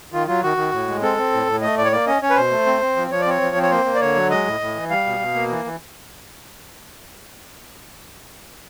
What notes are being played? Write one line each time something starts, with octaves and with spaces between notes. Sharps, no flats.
D#3 F4
F#3 F4
D#3 F#4
D#3
A2
G#3
C4 A4
C4
A2
A2
A3 D#5
A2 D5
C#5
A#3 D5
C#4 D#5
C#4 C#5
B4
B2 C5
A3
C4
C4
F3
F3 C#5
D5
C4 C#5
F3
C4
C#5
A#3 C5
A#3
D5
D3 C#5
F#3
G#3 D#5
A2
A2
E3
G3 F5
B2
B2
A#3
E3
E3